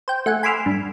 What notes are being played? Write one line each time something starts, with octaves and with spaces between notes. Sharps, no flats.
C5 G5
A3 F#5 G#5
G#5 B5 C6 D6 E6 F6
G2